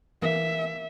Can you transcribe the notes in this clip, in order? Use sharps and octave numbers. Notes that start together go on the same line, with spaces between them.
E3 A#3 E5